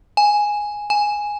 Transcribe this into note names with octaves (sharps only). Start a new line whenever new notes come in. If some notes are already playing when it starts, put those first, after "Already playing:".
G#5
G#5